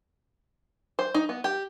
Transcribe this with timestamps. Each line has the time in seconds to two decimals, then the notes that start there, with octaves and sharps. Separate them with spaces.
0.99 C5
1.14 D#4
1.29 B3
1.44 G4